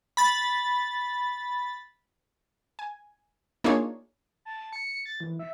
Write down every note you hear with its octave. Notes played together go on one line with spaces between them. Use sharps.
B5 A6
G#5
A#3 D4 D#4 F4 G#4 C#5
A5
A5
C#7
A6
E3
E5